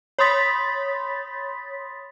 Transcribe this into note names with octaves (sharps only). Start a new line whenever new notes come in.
C#5 B5 C6 D#6 A6 B6